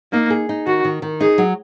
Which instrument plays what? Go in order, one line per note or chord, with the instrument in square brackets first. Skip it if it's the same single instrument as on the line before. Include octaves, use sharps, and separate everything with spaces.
[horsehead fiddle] A#3 [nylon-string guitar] D#4
[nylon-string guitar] G#4
D#4
[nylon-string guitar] D#3 [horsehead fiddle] F#4
[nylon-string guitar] D#3
D#3
[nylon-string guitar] D#4 [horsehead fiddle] G#4
[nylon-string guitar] F#3